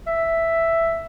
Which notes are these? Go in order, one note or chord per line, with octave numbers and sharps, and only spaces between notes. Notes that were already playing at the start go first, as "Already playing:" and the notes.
E5